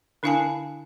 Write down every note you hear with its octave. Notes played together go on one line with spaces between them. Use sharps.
D3 D4 E4 F5 G#5 A5